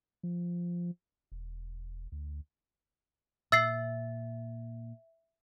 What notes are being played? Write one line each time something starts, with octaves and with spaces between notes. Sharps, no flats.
F3
E1
D2
A#2 E5 E6 A6 C7